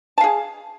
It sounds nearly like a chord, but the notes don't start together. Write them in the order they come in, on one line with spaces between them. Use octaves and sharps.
A5 F5 G#4